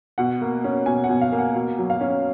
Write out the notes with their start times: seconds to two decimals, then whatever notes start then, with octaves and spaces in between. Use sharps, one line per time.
0.18 B2 F#5
0.42 A#3
0.64 C#4
0.86 B2 G#5
1.04 F#5
1.09 B2
1.21 F5
1.32 A#3
1.38 F#5
1.55 B2
1.78 F#3
1.90 F5
2.01 C#4